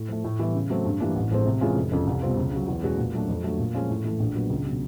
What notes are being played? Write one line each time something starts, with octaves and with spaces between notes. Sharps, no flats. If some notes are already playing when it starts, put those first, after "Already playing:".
Already playing: A2
F3 A3
A2
E3 G3 B3 E4
C#3
F#3 A3 C4
G2
E3 G3 A#3 D4
A1
A2 F3 G#3 C4
C3
E3 G#3 C#4 F4
F1
F2 C#3 F3
C2
B2 G3 C4 F4
C#2
C#3 F#3
E2
B2 G#3 C#4 F#4
A#2
F#3 A3 D4
F2
D3 F#3 A3
A#2
F3 G#3 C#4 F4
A2
E3 A3
A#1
A#2 F#3 B3
C#2
B2 F#3